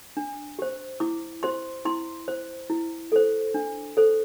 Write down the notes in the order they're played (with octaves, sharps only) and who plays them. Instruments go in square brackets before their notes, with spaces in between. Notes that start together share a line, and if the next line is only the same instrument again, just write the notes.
[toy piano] D4
G4 C5
E4 D6
G4 C5 C6
E4 C6
C5
E4
A4 C5
D4
A4 C5